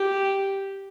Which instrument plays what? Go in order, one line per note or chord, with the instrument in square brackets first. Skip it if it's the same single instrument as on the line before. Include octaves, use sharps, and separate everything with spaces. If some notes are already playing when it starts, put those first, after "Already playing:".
Already playing: [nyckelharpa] G4